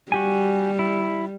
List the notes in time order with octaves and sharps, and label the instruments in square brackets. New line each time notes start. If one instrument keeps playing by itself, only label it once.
[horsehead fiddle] G3 [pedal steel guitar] F#4 G4 G#5
[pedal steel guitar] E4